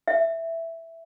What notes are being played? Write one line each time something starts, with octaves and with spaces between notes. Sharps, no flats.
E5